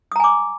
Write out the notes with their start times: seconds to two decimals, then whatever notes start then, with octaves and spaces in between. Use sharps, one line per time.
0.12 D#6
0.16 A#5
0.20 G#5
0.24 D6